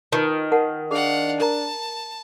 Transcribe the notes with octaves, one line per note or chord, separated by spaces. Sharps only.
D#3 F4 B4 A5
A#4 F#5 A5
D4 G#4 F5 F#5
A#4 A5 A#5